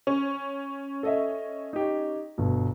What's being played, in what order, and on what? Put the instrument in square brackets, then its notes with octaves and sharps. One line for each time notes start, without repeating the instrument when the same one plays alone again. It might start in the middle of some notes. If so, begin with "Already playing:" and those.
[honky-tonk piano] C#4
[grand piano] A4 D#5 E5
D#4 G4
G1 B2